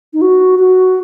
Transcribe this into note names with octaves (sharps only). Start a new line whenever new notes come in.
D#4
F#4
F#4